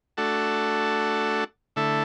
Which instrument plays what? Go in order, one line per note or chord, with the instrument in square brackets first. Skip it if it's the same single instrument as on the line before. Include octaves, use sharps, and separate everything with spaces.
[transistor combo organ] A3 D4 F#4 A4
D3 A3 E4 A4